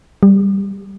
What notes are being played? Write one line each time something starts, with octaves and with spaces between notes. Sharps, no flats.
G3